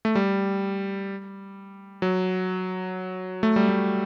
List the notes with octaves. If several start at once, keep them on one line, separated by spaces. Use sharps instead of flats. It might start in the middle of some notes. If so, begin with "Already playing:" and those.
A3
G3
F#3
A3
G3
A3